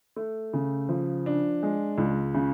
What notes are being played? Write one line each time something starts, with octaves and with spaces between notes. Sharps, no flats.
A3
C#3
F3
D4
G#3
C#2
C#3